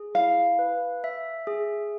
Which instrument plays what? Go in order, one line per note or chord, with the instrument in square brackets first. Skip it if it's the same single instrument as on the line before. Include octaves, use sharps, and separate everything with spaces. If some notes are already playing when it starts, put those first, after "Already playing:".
Already playing: [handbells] G#4
[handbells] E4 [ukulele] F5
[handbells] B4
E5
G#4